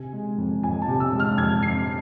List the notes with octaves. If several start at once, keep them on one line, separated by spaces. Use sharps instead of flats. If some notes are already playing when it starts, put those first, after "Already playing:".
Already playing: C3 G#5
G#3
F2
F2 G#5
A5
C3
E6
G#3
F6
F2 G#6
F2 C7